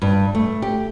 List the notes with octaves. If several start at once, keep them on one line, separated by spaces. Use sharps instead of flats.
G2
A3
G4